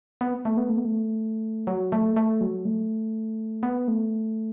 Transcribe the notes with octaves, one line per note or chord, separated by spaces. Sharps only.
B3
A3
B3
A3
B3
A3
F#3
A3
A3
F#3
A3
B3
A3